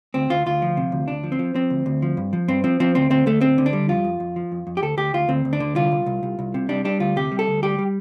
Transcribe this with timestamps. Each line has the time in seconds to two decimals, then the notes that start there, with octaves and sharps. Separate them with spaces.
0.14 D2 C4
0.30 D2 F4
0.46 D2 F4
0.62 F3
0.77 C3
0.92 D2
1.08 D2 D4
1.23 F3
1.32 C4
1.39 F3
1.54 F3 C4
1.70 D2
1.86 D2
2.02 F3
2.17 G2
2.33 F3
2.48 G2 C4
2.64 F3 C4
2.80 F3 C4
2.95 D2 C4
3.10 D2 C4
3.26 D2 A3
3.41 D2 C4
3.58 D3
3.66 D4
3.73 G3
3.89 F2 F4
4.04 F2
4.20 F2
4.36 F3
4.52 F2
4.67 F2
4.77 G4
4.82 D2 A4
4.97 D2 G4
5.14 D2 F4
5.28 D2 C4
5.45 D2
5.53 D4
5.60 D3
5.76 C2 F4
5.92 C2
6.06 C2
6.23 C2
6.39 C2
6.54 C3
6.69 G3 D4
6.85 G3 D4
7.00 D2 F4
7.16 C3 G4
7.32 G3
7.39 A4
7.48 D2
7.63 G3 G4
7.79 G3